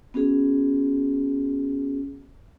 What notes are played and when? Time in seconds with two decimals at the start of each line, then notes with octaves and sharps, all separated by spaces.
0.14 B3 C#4 F#4 G#4